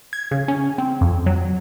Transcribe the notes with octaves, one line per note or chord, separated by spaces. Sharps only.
G#6
C#3
C#4
C4
F2
F#3